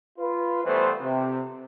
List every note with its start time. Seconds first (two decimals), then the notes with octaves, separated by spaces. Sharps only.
0.19 F4 B4
0.65 E3 G3 A3 B3 C5
1.01 C3